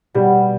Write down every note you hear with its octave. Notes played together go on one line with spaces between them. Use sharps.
B2 G3